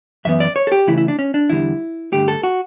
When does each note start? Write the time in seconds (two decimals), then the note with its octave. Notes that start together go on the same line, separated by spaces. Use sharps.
0.25 F#2 E3 B3 E5
0.40 D5
0.56 C#5
0.67 A4
0.72 G4
0.87 C#3 E3 A3 E4
0.98 E4
1.08 D4
1.19 C#4
1.34 D4
1.49 E2 D3 G3 E4
2.12 G2 D3 A3 G4
2.28 A4
2.43 F#4